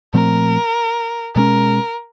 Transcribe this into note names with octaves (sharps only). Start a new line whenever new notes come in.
A#2 F3 A3 C4 A#4
B2 G#3 C#4 A#4